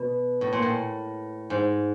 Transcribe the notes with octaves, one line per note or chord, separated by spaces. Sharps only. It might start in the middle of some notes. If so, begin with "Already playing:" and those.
Already playing: B2
A2
A#2
A2
G#2